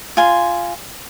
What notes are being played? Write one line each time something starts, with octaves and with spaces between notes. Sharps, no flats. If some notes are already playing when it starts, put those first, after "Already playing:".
F4 G#5 C6